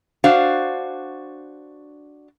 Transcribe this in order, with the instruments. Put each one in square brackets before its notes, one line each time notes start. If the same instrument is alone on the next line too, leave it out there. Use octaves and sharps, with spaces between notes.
[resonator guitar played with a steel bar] D4 F#4 C5 F5